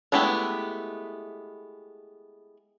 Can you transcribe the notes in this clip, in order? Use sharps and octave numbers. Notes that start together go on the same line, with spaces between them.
G#3 A3 B3 E4 G4